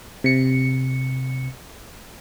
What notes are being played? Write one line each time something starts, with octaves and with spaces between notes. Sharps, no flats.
C3 C#7